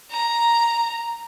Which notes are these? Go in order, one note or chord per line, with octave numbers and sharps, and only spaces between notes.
A#5